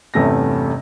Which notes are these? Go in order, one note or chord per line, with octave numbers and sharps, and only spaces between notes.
G1 E2 C3 A3 C#4 A#6